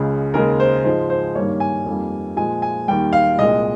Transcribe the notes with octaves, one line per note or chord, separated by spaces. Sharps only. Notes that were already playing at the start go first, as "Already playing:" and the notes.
Already playing: C#2 C#3 G#3
D#2 C#3 G#3 A#4
C5
G#2 F3 G#3 C5
C5
G2 D#3 G3 A#3 C#5
G#5
F2 D#3 G3 A#3
A#2 F3 G#3 G#5
G#5
D#2 D#3 G3 G5
F5
C2 A#2 G#3 D#5